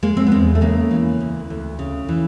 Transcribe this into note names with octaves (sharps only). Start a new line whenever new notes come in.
G#3 A#3
C4
B3
E2 C4
A3
C#3 A#3
E3
D2
D2
C#3
E3